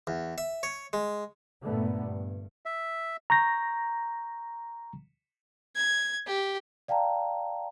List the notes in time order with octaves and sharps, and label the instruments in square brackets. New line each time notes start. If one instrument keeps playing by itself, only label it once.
[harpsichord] E2
E5
C#5
G#3
[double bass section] G2 A#2 D3 A3 B3
G2
[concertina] E5
[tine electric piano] A#5 C#6 G6 A#6
[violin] G#6
G4
[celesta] D5 F5 G5 A5 A#5